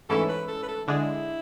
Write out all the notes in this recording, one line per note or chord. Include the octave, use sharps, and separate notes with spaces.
G#2 E3 A3 C#4 E4 A4
B4
A4
B4
A4
D3 G#3 D4 E4 G#4